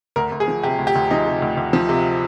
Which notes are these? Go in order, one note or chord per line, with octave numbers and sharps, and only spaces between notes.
D2 A#4
D2
G#4
F3
C3 G4
D2
G4
D2
F3 D#4
C3
D2
D2
F3
C3